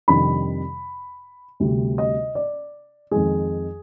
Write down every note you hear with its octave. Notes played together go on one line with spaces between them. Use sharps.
F2 C3 D#3 G3 D4 B5
D2 C3 G3
D#5
D5
F2 D#3 G#3 G#4